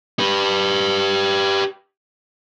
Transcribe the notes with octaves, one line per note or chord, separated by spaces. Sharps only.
G4 B4